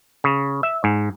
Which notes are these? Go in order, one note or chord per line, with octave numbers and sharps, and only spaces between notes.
C#3
E5
G#2